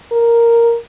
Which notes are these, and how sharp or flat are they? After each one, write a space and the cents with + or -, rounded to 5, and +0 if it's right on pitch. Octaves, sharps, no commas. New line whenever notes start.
A#4 +0